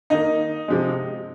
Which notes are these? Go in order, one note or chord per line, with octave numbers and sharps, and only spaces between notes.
D#3 A#3 D#4 D#5
C3 F3 G#3